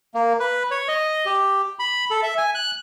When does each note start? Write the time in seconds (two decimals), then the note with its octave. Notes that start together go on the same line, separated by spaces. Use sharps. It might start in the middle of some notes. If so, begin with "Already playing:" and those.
0.15 A#3
0.39 B4
0.71 C#5
0.88 D#5
1.26 G4
1.79 B5
2.11 A4
2.23 E5
2.37 G#5
2.55 F#6